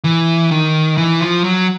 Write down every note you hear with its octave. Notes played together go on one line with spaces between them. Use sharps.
E3
D#3
E3
F3
F#3